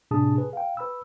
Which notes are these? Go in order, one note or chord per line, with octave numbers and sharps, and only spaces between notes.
A2 C3 D4 G#4 A5 D#6
G#4 B4
F5 G5
B4 B5 E6